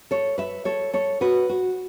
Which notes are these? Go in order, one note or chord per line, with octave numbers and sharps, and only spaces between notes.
A4 C#5
B4 E5
A4 C#5
A4 C#5
F#4 B4
F#4